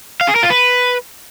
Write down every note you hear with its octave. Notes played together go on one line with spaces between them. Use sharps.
F5
G#4
A#4
F4
B4